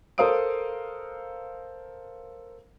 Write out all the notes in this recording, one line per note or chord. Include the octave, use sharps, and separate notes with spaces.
A4 A#4 C5 F5 D#6 D7